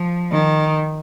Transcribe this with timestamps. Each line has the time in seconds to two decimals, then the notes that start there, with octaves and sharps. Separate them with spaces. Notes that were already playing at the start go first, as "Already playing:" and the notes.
Already playing: F3
0.31 D#3